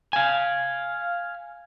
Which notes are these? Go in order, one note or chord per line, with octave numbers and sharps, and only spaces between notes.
F5 G#5